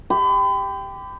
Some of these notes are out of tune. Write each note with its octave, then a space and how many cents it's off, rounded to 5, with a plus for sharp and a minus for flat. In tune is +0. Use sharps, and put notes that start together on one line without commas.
G4 +0 B5 +40